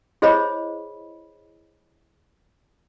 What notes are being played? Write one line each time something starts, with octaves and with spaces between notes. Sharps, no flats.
E4 G#4 C5 C#5 D#5 B5